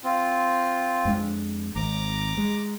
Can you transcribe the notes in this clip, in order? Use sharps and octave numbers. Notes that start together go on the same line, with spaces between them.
C4 F4
F2 G#3 D4
G#1 A#5 D6
G#3